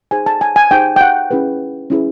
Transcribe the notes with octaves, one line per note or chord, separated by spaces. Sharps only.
D#4 G#4 C5 G#5
A5
G#5
G#5
D#4 G#4 C5 G5
G5
F#5
C#4 E4 G#4 B4
C#4 E4 G#4 B4